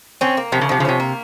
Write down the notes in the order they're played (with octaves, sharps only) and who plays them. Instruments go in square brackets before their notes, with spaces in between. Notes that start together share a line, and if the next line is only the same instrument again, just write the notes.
[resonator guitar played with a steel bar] C4 [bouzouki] C#4
[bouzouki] A#3
[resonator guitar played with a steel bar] C3 [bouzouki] F3
[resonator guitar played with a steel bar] C#3
[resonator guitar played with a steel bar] C3 [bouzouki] F3
[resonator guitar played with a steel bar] C#3
[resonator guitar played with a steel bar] C3 [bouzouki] C#4
[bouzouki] A#3